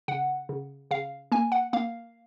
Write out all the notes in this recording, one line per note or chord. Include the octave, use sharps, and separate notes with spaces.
C#3 F#5
C#3
C#3 F5
A#3 G#5
F#5
A#3 F5